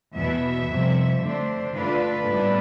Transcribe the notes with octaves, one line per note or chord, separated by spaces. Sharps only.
E2 B2 B3 E5
F2 C3 G3
D3 A3 D4 C5
D3 A3 D4 F4 B4
A2 G3 B3 D4